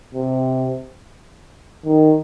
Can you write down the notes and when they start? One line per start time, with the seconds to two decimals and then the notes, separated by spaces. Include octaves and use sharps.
0.15 C3
1.85 D#3